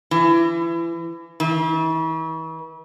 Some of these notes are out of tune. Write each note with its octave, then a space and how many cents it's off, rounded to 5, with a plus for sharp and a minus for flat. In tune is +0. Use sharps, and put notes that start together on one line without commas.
E3 +30
E3 -40